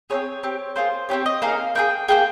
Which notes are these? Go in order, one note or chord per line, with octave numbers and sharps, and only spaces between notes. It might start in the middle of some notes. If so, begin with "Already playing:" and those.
C4 D#4 G#4 C#5
C4 G4
A#3 F4 G#4 C5
C4 D#4 G4 C#5
D#5
A#3 D#4 G#4 F5
A#3 D#4 G#4 G5
A#3 F4 G#4 G5